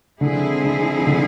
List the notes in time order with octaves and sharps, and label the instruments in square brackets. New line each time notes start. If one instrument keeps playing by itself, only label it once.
[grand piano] D3 [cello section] F3 G#3 C4 E4 G#4
[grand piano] D3
D3